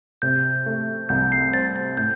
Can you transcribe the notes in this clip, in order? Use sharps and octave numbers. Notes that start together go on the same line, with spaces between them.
C3 G6
A3
C2 G6
C7
C4 A6
A6
A2 G6